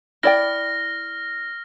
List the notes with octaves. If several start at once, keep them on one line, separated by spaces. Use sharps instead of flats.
E4 D5 G5 F6 A#6